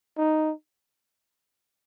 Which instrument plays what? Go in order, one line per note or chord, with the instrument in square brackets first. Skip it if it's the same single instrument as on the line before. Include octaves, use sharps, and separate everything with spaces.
[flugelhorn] D#4